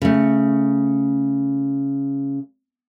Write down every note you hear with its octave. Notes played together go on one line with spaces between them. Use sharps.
C#3 A3